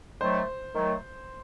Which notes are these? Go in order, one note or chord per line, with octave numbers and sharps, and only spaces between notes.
D#3 F#3 A3 C5
D#3 F#3 A3